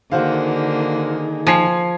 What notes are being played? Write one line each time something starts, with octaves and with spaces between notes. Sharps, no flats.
D3 D#3 A#3 D#4 F#4 G#4 C5 F5
F3 G#5 G#6 C7